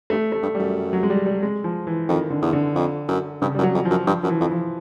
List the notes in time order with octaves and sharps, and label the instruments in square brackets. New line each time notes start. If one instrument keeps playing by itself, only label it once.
[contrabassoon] G2 [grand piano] A3
[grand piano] A3
[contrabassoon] G2
[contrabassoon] F#2 [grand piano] G3
[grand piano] F#3
G#3
G3
G3
G#3
F3
E3
[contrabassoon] F2 [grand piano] D#3
[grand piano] D3
[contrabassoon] E2
[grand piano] D3
[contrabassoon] F2
F#2
[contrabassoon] G2 [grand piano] C#3
[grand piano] G3
[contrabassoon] F#2
[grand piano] F#3
[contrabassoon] F2
[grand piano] F3
[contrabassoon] F#2
[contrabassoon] G2 [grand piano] F3
[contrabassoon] F#2 [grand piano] F3
[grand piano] E3
[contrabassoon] F2
[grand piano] F3